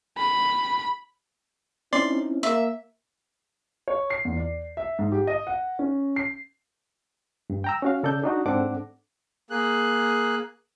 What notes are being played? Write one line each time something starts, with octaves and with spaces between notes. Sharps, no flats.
B5
C4 C#4 D#4 E4 D5 C6
A#3 E5
C#5
C7
E2
D5
E5
G#2
G4
D#5
F#5
C#4
C7
G2
G5 A#5 E6
C#4 F#4 F5
C#3 A4 D5 G6
D4 D#4 F#4
G#2 C4 D4 A4 F#5 D6
A#3 G#4 F#6